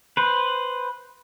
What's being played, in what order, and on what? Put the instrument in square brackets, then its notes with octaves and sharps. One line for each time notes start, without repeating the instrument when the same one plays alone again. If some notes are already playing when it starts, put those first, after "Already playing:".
[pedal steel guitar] B4 C5